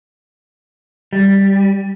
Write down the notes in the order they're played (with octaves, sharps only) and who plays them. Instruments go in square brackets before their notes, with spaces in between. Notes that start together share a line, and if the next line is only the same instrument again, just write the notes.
[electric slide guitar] G3